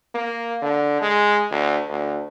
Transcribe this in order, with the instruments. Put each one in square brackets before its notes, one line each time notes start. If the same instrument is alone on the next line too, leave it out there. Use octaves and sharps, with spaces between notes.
[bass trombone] A#3
D3
G#3
D2
D2